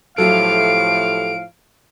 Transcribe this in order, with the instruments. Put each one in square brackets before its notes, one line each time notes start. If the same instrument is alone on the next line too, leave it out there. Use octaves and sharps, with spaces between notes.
[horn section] A2 F3 F5 [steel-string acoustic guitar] F#3 A3 G4 [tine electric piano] A4 [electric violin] D7